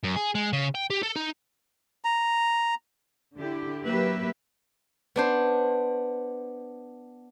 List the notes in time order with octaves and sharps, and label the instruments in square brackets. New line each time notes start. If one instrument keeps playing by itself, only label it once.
[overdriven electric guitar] F#2
G#4
G#3
C#3
G5
G4
A4
D#4
[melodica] A#5
[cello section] D3 E4 G4
F#3 A#3 G4 B4 E5
[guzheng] B3 D4 C5